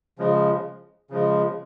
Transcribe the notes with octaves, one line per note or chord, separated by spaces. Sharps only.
C#3 F3 G#3
C#3 F3 G#3